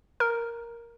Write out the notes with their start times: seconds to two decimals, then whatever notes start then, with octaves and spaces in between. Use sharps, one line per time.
0.20 A#4